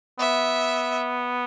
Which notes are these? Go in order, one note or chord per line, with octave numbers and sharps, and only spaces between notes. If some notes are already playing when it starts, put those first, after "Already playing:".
B3 E5